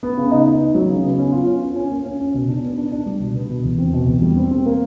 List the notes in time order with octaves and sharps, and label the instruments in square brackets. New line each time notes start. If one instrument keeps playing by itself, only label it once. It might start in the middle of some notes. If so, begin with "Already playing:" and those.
[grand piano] B3
C#3
D#4
D#4
D#4
F#3
C#3
B3
C#4
F4
C#4
F4
C#4
A#3
C#4
C#4
B2
D4
B3
D4
D4
G3
B2
B3
B2
E2
C4
B2
E2
G3
C4
C4
A#3